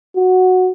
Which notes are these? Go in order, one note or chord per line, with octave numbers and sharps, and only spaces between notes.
F#4